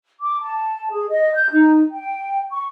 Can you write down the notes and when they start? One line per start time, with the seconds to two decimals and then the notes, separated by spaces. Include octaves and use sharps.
0.20 D6
0.41 A5
0.91 G#4
1.10 D#5
1.35 G6
1.51 D#4
1.91 G5
2.50 C#6